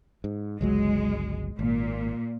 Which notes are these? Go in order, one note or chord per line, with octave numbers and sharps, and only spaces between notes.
G#2
G1 C#2 F#3 G#3
G#1 A#2